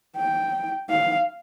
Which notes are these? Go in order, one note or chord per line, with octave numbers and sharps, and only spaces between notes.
G5
F5